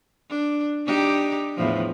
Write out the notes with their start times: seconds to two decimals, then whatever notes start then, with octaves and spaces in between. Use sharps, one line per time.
0.30 D4
0.86 D4 D#4 G4
1.56 E2 A2 F3